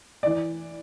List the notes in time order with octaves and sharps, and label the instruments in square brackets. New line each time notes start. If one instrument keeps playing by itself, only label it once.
[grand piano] E3 D5